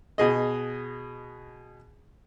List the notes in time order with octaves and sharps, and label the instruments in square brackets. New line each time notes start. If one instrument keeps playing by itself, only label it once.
[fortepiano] B2 G#4 D#5